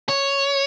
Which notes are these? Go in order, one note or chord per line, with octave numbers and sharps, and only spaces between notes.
C#5